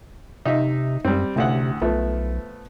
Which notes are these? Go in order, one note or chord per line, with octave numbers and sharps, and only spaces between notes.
C3 D#4 D#5 E5
F#2 G3 C4
A1 D2 C3 F#5
B1 F3 A3 B3